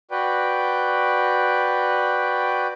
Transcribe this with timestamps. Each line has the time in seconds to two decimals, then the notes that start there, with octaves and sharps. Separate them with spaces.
0.11 F#4 B4 D5 G5